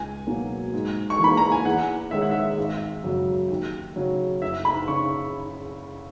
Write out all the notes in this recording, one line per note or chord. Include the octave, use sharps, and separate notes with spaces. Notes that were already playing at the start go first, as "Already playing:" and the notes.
Already playing: C#2 G#5
B2 F#3 A#3
G#2
C#6
E3 A#3 B5
A#5
G#5
E2 F#5
D#3 G#3 C#4 E5
F#5
E5
G#1
F#2 C#3 F#3
D#2
C#3 F#3 C#4
F#1 E5
B5
C#3 C#6